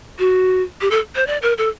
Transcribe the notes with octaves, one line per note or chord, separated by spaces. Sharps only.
F#4
G4
A4
C5
D5
A#4
A4